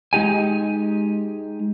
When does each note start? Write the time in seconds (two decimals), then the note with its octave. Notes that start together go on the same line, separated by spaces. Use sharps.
0.13 G#3 D#4 G4 G#5